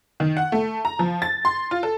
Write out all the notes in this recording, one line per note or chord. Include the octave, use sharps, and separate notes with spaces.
D#3
F#5
A3
A#5
F3
A6
C6
F4
A4